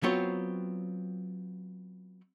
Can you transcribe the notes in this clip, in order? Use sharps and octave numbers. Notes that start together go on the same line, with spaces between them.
F#3 B3 C4 F4 C#5